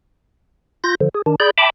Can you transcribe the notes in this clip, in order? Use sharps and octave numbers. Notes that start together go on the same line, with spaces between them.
F4 G6 A#6
D3 F3
G#4
D#3 D4
G#4 D5 B5 G6
E5 G5 A5 B5 D6